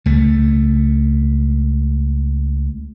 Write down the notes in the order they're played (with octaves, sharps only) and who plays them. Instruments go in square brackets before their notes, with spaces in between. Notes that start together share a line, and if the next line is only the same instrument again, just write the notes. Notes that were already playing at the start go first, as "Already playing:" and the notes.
[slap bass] C#2 A3